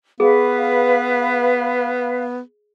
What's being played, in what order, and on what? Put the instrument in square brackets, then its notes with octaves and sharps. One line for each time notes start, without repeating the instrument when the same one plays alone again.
[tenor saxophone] B3 [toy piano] G#4 [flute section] B4 F5